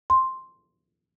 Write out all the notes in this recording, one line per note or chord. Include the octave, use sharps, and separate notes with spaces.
C6